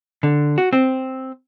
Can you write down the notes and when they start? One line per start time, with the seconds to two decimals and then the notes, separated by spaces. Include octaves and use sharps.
0.23 D3
0.58 F#4
0.73 C4